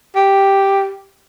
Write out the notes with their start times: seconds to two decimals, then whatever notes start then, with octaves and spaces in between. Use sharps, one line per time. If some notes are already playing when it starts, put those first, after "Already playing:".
0.15 G4